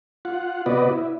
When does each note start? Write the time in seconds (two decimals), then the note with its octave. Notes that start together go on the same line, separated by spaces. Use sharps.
0.25 F4 F#5
0.66 C3 B3 F#4 B4 D5 D#5
0.89 E4